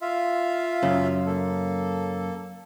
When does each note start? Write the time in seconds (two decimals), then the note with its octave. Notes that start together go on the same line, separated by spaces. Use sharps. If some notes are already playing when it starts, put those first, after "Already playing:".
0.02 F4 E5 F5
0.83 F#2 C#3
1.26 A#3 A4